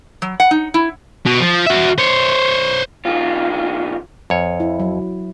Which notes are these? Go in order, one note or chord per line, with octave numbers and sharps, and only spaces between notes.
F#3
F#5
D#4
E4
B2
F3
F#4 E5
C5 C#5
B1 F4
F2 C#5
E4
F#3